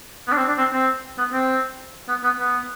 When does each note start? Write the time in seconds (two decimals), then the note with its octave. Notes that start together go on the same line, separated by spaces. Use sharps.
0.28 B3
0.32 D4
0.37 C4
0.48 D4
0.58 C4
0.73 C4
1.18 B3
1.33 C4
2.08 B3
2.23 B3
2.39 B3